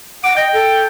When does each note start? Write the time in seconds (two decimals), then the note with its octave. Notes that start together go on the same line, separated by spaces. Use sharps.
0.24 F#5 D6
0.36 D#5 G5
0.53 A4